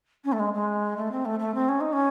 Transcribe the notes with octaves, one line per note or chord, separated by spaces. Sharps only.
C#4
A3
G#3
G#3
A3
C4
A3
A3
C4
C#4
D#4
C#4